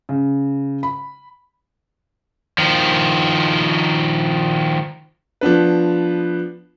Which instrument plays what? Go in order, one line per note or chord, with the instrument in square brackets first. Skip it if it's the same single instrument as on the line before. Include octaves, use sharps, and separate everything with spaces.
[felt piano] C#3
B5
[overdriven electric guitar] D#3 F3
[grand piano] F3 B3 D4 B4